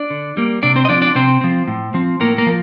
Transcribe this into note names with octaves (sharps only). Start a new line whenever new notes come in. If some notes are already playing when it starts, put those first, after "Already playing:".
Already playing: D4 D5
D3
G3 A#3
C3 D4 D5
C4 C5
D#5
F3 C4 D4 D5
D4 D5
C3 C4 C5
F3 C4
A2
F3 C4
A2 A#3 A#4
A#3 A#4
F3